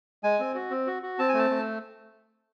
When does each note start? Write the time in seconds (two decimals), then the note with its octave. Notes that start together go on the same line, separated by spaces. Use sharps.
0.24 G#3 G#5
0.39 C4
0.55 F#4
0.70 C4
0.87 F#4
1.03 F#4
1.19 C4 A5
1.29 G#5
1.34 A3 A5
1.50 A3